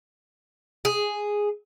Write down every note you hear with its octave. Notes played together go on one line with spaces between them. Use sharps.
G#4